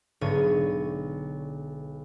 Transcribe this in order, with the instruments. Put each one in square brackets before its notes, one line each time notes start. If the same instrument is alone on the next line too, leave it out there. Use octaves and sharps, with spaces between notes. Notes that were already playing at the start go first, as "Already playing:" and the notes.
[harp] B1 G#2 D3 C#5 D#7